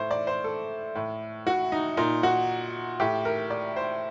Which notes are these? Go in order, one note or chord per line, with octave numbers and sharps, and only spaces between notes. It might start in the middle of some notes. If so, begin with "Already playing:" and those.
Already playing: A2 C5
D5
C5
A4
A2
F#4
D#4
A#2 D#4
F#4
A2 G4
A#4
D5
C5